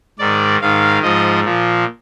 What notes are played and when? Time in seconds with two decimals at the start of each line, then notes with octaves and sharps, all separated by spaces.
0.19 G#2 D#3 D5
0.61 G#2 D#3 F5
1.03 G#2 F3 D#5
1.44 A#2 F3